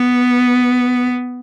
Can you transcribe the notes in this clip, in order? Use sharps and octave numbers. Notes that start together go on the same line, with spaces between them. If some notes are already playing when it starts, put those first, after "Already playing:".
Already playing: B3